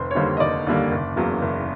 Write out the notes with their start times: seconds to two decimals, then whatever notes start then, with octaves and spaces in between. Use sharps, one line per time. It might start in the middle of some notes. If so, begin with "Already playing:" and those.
Already playing: F1 C5
0.11 C#5
0.15 D#2 D3 G3 A#3 C5
0.37 D#5
0.40 F1 D5
0.67 D#2 D3 G3 A#3
0.92 F#1
1.16 E2 C#3 F#3 A#3
1.42 F#1